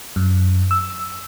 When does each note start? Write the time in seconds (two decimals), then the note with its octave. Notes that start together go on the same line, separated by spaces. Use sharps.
0.16 F#2
0.71 E6